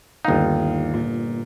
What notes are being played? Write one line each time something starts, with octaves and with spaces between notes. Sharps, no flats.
G1 D#2 D#4 F5
A#2